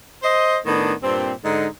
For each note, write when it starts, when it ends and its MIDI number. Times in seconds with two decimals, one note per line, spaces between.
0.23 0.58 72
0.23 0.58 75
0.66 0.94 45
0.66 0.94 51
0.66 0.94 59
0.66 0.94 62
1.03 1.33 43
1.03 1.33 46
1.03 1.33 60
1.44 1.67 44
1.44 1.67 50
1.44 1.67 63